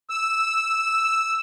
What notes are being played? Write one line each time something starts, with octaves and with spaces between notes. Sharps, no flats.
E6